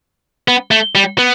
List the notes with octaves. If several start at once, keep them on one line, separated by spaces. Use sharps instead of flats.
B3
A3
G3
B3